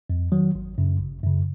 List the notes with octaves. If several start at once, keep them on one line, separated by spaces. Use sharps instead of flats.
F2
D#3 F#3
G#1
F#2 C#3
G#1
F#2 C#3